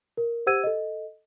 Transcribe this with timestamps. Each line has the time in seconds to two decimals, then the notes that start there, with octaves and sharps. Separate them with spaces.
0.17 A#4
0.46 G4 C5 F#5 E6 G#6 D#7
0.64 A4 D#5